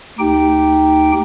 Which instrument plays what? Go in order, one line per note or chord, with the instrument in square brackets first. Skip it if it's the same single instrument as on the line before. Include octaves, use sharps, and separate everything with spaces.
[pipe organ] D2 D#4 G4 G5